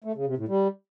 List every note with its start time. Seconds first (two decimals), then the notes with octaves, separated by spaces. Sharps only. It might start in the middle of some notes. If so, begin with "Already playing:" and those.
0.04 A3
0.15 C#3
0.26 C3
0.37 A2
0.48 G3